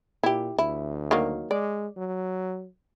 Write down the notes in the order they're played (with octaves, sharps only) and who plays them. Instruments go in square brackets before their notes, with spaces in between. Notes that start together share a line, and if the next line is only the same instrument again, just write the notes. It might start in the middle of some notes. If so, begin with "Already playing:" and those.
[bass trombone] A#2 [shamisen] E4 G4
[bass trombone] D2 [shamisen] E4
[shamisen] D#3 F#3 A#3
[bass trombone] G#3 [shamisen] D5
[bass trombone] F#3